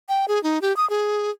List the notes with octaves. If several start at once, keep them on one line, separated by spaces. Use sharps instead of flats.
G5
G#4
D#4
G4
D#6
G#4